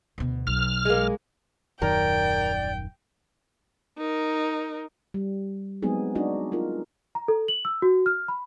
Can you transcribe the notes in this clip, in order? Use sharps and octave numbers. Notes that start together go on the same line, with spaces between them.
D2 B2
B1 F6
G#3 A#3
D#1 F#2 D#3 A#4 D5 G5
D#4 A#4
G3
F#3 G#3 B3 C4 D#4 G#4
D4 D#4 F#4 D#5
D#4 F4 A#4
A#5
A4
F#7
E6
F#4
F6
B5